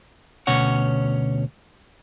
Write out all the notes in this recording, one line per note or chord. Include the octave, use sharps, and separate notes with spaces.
D2 B2 C#4 C#5 F#5